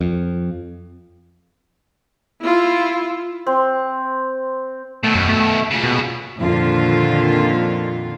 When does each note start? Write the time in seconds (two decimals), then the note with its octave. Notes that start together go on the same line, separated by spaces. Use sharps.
0.01 F2
2.42 E4 F4
3.47 C4
5.03 B2 D#3 A3
5.15 F#2
5.29 A3
5.71 A#2 C#3
5.83 B2
6.37 F2 A#2 D3 D#3 F4